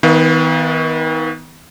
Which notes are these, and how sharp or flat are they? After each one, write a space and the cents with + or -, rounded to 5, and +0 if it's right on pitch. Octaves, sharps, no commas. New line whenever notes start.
D#3 +40 B3 +10 F5 -15